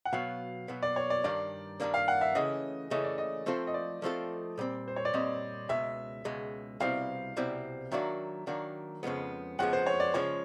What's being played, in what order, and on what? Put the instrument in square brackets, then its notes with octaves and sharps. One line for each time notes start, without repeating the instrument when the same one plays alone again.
[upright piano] F#5
[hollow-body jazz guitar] B2 F#3 B3 [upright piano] F5
[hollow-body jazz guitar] B2 F#3 B3
[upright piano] D5
C#5
D5
[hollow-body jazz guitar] G2 D#3 G3 A#3 D4 [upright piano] D5
[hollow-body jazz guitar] G2 D#3 G3 A#3 D4
[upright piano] F5
F#5
E5
[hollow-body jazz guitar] C#3 E3 A3 C#4 [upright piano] D#5
[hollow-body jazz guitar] C#3 E3 A3 C#4 [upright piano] D#5
[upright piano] D5
D#5
[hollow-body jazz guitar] F3 A3 C4 F4 A4
[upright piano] D#5
D5
[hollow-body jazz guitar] F3 A3 C4 F4 A4
A#2 G3 C4
[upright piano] C5
C#5
D5
[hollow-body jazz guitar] A#2 G3 C4 [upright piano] D#5
[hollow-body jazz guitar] C#2 B2 G#3 [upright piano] E5
[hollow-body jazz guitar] C#2 B2 G#3
[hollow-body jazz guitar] C2 B2 G3 C4 E4 [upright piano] F5
[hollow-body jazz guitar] C2 B2 G3 C4 E4
[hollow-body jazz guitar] D#3 F#3 A#3 D4 F#4 [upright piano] E5
[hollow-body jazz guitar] D#3 F#3 A#3 D4 F#4
F2 C#3 F3 G#3 B3
[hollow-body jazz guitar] F2 C#3 F3 G#3 B3 [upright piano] F#5
[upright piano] C5
C#5
D5
[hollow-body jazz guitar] C#3 F3 G#3 [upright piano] C#5